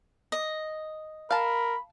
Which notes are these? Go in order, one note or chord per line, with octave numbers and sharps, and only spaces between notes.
D#5
A#4 F5 A5 B5